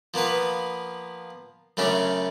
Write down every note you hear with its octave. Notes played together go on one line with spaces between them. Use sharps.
F3 A#3 B3 B4
F#2 C#3 A3 C#4 D4